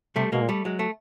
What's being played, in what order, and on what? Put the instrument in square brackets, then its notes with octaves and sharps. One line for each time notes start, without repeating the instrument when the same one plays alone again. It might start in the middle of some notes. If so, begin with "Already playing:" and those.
[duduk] C3 [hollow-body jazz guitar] G3 A3
[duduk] B2 [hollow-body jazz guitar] G#3 A#3
[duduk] A#2
[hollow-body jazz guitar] G3 A3
F#3 G#3
A3